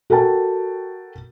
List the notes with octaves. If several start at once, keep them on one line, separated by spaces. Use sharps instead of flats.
F#4 A4 A#4 G5 A5